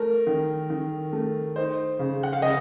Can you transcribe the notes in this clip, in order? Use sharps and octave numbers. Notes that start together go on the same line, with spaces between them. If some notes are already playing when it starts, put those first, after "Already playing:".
Already playing: A3 A#4
D#3
D#3
A3
D#4 C5
C#3
F#5
F5
C#3 D#5